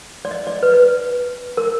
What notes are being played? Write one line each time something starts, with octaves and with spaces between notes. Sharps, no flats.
D5
D#5
D5
B4
B4
A#4